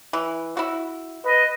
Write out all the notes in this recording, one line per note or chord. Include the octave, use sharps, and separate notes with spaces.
E3
E4 F#4
B4 D#5